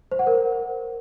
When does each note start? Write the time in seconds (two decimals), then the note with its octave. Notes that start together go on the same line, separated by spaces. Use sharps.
0.12 C5
0.19 F#5
0.27 A#4